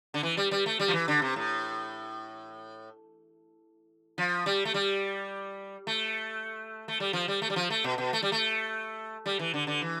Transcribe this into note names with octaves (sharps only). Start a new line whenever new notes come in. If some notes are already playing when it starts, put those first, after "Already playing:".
D3
E3
G3
G3
A3
G3
F3
E3
D3
C3
A2
F3
G3
A3
G3
A3
A3
G3
F3
G3
A3
G3
F3
A3
B2
B2
A3
G3
A3
G3
E3
D3
D3
E3